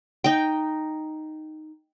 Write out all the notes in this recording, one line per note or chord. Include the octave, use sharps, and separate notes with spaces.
D#4 G5